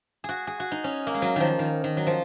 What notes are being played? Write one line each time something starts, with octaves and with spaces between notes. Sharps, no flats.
F#4 G#4
G#4
F#4
D#4
C#4
A#3
G#3
F#3
D#3 F3
D#3
D#3
F#3
F3